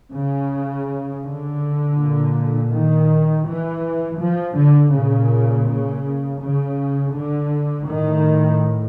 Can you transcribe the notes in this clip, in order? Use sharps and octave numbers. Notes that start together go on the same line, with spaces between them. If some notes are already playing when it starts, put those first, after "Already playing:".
C#3
D3
A#2
D#3
E3
F3
D3
A#2 C#3
C#3
C#3
D3
A2 D#3